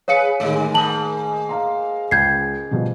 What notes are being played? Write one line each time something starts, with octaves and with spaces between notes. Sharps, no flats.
G#4 B4 C#5 F5 C#7
A2 D#3 G3 D#4
G#2 A#3 A5 F#7
F5 A#5 C6
C#2 G6 G#6 C7
B2 F3 G3